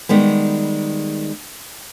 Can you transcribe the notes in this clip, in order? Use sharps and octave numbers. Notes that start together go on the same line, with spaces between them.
D#3 G3 G#3 B3